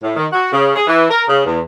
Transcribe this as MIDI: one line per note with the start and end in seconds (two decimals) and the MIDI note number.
0.02 0.16 45
0.16 0.26 51
0.32 0.48 66
0.52 0.73 49
0.76 0.86 68
0.87 1.05 52
1.10 1.23 70
1.28 1.40 49
1.45 1.59 40